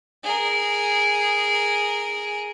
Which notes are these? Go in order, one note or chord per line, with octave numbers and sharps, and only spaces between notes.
G#4 A#4